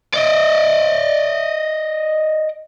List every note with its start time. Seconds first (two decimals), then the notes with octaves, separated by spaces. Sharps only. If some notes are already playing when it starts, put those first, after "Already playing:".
0.14 D5 D#5